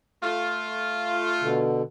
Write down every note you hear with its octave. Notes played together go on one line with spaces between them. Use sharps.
A3 F4
B2 D3